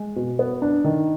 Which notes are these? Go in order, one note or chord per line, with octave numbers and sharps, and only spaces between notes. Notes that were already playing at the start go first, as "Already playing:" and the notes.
Already playing: G#3
B2
B3
D4
D#3